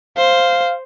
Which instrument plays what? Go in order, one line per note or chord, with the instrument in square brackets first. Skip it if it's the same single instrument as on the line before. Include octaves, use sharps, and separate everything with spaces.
[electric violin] C5 [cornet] F5